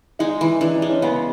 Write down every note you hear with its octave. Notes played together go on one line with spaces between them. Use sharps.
G#3 D#4
E3
E3 D4
D4
G#3
C#4
C#3 B3